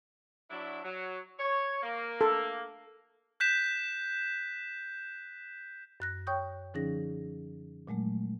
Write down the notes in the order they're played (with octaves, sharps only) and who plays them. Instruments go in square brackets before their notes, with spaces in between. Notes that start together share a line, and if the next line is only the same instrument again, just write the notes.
[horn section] F#3 D4 E4
F#3
C#5
A#3
[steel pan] A4
[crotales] F#6 G6 B6 E7
[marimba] F#2 F#6 A#6
C#5 G5 C#6 D#6 G6
D3 F3 C#4 D#4 G#4 A#6
A#2 F#3 G#3 A3